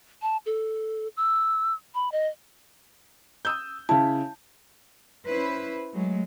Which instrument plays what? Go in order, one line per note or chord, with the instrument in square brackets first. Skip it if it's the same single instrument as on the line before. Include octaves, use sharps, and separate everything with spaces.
[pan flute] A5
A4
E6
B5
D#5
[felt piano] D#6 E6 G6
[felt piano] C#3 E4 [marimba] A5
[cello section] C#4 E4 B4 C5
F#3 G#3 A3